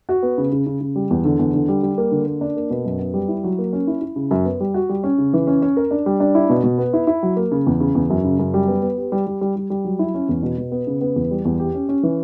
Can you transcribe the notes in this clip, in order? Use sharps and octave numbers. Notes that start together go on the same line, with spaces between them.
F#4
B3
C#3
C#3
C#3
C#3
G3
E2
D3
E2
D3
G3
G3
A#3
D3
A#3
D4
A#3
B2
F#2
B3
G3
E4
F#3
A#3
C#4
E4
E4
C#3
F#2
B3
G3
F#4
G3
C#4
C#3
E3
C#4
C#4
A#4
D4
G3
D4
E4
B2
B2
B3
E4
E4
F#3
A#3
C#3
E2
C#3
E2
F#2
C#3
F#2
G3
B3
B3
G4
G3
G3
G3
G3
G3
F#3
E4
C#4
E2
B2
B2
B3
C#3
B3
E2
G3
E2
G4
C#4
C#4
E3